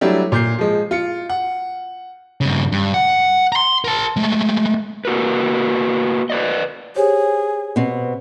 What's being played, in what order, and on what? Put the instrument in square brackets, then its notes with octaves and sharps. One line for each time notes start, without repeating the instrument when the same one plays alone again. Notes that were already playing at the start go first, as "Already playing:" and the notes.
[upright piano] F#3 G3 A3 D4 E4 G4
A#2 G6 C7
F3 G#3
F4 C#7
F#5
[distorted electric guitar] G2 C#3
G2
F#5
A#5 C6
A#4 A5
G#3 A3
[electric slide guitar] A#3 F#4 A#4 B4
B4 D5 D#5
[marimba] G4 C5 C#5 [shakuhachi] G#4
[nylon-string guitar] B2 C4